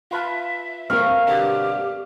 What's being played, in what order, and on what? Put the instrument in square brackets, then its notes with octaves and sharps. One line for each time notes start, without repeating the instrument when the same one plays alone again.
[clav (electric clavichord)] F4 B4 A5 [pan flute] E5
[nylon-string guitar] C4 A#4 [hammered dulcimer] F5 C#6
[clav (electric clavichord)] G2 B2 D3 [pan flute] G4